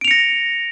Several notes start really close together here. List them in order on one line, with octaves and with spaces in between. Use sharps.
D7 F7 C#7 A#6